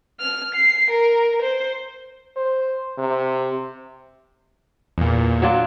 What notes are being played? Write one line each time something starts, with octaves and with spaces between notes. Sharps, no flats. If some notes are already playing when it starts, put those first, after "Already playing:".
F6
C7
A#4
C5
C5
C3
E2 A#2
F#3 D4 F4